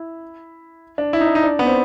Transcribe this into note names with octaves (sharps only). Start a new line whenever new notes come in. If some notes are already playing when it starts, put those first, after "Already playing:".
Already playing: E4
D4
E4
D#4
D4
D#4
D4
B3
C4